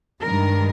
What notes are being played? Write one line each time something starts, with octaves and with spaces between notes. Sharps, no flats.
G2 D#3 G#3 A#4